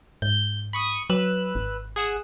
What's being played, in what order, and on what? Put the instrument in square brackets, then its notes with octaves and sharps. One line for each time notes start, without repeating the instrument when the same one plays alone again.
[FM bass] G#2 [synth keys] G6
[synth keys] B5 C#6 D#6
[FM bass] F#3 [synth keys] B4 E6 F#6
[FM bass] G#1
[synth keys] G#4 F#5 E7